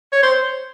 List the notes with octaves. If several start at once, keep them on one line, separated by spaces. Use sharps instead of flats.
C#5
C5